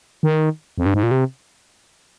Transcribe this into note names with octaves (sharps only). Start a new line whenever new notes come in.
D#3
F2
G2
G#2
A#2
C3